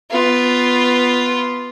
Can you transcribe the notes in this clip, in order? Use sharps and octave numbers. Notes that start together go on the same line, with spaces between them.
B3 F4